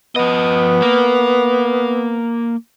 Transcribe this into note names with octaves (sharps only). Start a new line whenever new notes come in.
F3 B3 D#5
A#3 A#4